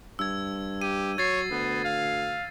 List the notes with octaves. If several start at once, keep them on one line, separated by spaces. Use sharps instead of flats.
G2 E6 G#6
G4 D#7
F#3 C#5 G#6 A6 C7
D2 B3
F5